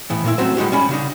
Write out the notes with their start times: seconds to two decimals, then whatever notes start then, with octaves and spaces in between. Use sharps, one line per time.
0.10 A2 E3 B3
0.24 A#2 A#3 E4
0.38 F#3 A3 C4 C#4 F#4 C5
0.57 A2 G#3 D#4 F#4 G4
0.72 G3 C#4 B5
0.89 C#3 D4 D#4